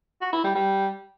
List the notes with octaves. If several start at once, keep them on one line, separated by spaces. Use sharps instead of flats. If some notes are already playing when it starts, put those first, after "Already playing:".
F#4
E4
G3
G3